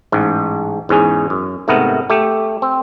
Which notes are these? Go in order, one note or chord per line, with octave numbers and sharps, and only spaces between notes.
A1 G#2
E2 G#2 C#4 G#4
F#2
G#2 C3 A3 B3 A#4
A3 G4
C4